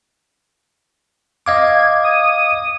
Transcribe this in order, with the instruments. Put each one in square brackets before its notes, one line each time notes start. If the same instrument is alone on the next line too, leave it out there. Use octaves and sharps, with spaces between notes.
[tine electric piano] D#5 F5 D6 [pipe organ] G#6
[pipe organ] D#6